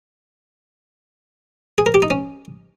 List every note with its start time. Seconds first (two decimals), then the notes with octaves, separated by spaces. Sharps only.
1.78 G#4
1.86 A#4
1.94 G4
2.02 D#4
2.10 C#4